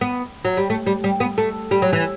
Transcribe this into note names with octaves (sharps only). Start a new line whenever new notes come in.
B3
F#3
G3
A3
G3
G3
B3
A3
G3
F#3
E3